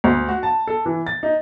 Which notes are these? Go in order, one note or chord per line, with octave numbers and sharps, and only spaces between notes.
D2
F#4
A5
A4
E3
A6
D#4